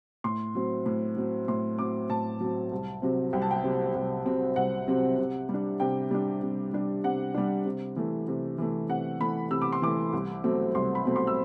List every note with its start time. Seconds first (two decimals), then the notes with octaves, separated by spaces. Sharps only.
0.24 A2 C6
0.55 F#3 C4
0.86 A2
1.16 F#3 C4
1.48 A2 C6
1.79 F#3 C4 D6
2.09 A2 A5
2.40 F#3 C4
2.72 C2
3.02 C3 F#3 C4
3.33 C2 G5
3.42 A5
3.51 G5
3.64 C3 F#3 C4
3.95 C2
4.25 C3 F#3 C4
4.56 C2 F#5
4.88 C3 F#3 C4
5.18 C3
5.49 G3
5.54 D4
5.80 C3 G5
6.11 G3 D4
6.42 C3
6.73 G3 D4
7.04 C3 F#5
7.34 G3 D4
7.65 C3
7.96 E3 A3
8.28 C3
8.58 E3 A3
8.89 C3 F#5
9.20 E3 A3 B5
9.51 C3 E6
9.62 D6
9.72 C6
9.82 E3 A3 D6
10.13 C2
10.44 B2 F#3 A3 C4
10.75 C2 C6
10.95 B5
11.05 B2 F#3 A3 C4
11.16 C6
11.27 E6